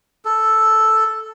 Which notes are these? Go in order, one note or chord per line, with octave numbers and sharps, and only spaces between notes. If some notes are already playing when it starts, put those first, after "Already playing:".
A4